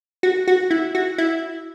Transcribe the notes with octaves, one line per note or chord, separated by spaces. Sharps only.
F#4
F#4
E4
F#4
E4